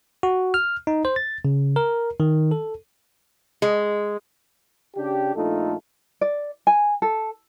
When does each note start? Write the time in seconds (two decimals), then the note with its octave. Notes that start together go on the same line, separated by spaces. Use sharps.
0.23 F#4
0.54 F6
0.87 D#4
1.05 C5
1.16 A6
1.45 C#3
1.76 A#4
2.20 D#3
2.51 A4
3.62 G#3
4.96 C#3 D4 G4
5.35 A#1 A3 D#4 F4 A4
6.21 D5
6.67 G#5
7.02 A4